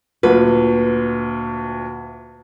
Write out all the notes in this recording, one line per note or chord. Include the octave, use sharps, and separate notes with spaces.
D2 A#2 B4